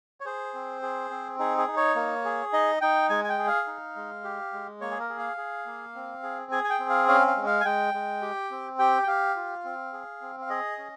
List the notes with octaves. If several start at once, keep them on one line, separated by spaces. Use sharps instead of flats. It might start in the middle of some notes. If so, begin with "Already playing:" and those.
C#5
G#4 C5
C4
G#4
C4
D#4 G#4
G#4
D#4
C#5
A#3
G#4
D#4 D#5
D#4 G5
G#3 G#5
G#5
G5
G#4
F5
D#4
G#3
G4
G#3
A#3 C#5
G#4
A#4
G#4
F5
G#4
A#3
C4
G#4
G#4 G#5
G#5
G5
C4
F5
C#4 F5
F5
G#3
F5
G#5
G#3 G5
G#3
G4
C4
G4 G5
G5
G4 F5
F4
C4
G#4
C4
F5
G#4 D#5
C#4